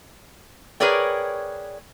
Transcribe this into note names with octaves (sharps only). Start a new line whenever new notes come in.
G#4 A#4 B4 C#5 D5 G5